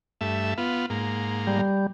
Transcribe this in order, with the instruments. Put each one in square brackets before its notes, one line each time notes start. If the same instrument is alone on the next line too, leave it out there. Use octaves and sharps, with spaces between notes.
[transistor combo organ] G2 A3 E5
B3 F4
G#2 A#3
[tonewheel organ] G3
G3